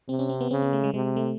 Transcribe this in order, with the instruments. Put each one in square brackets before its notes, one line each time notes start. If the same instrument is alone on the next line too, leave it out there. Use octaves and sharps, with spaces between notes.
[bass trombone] C3 [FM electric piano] C4
[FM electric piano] C#4
C4
B3
[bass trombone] C#3 [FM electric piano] C4
[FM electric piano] B3
A3
G#3
[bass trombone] C3 [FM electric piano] G#3
[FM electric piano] A3